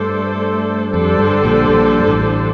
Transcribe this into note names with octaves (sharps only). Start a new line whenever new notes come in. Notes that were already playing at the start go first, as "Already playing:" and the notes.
Already playing: G2 A3 D4 A4 C5
F2 D3 G3 D4 A4 C5
G2
A#1 A#2
A#1 A#2
G2
A1 A2